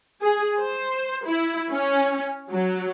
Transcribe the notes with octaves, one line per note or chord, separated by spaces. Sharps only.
G#4
C5
E4
C#4
F#3